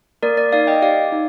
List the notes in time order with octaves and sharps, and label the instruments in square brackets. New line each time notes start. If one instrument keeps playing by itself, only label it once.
[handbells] A#3 A#4 D5
A#4 D5
D#4 D5 F5
D#5 G5
G4 D5 F5
D#4